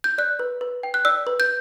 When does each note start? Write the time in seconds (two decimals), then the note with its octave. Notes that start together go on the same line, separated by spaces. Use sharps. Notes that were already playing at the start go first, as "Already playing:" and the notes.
0.04 G6
0.18 D5 F#6
0.39 B4
0.61 B4
0.83 G5
0.94 F#6
1.05 D5 E6
1.27 B4
1.40 G6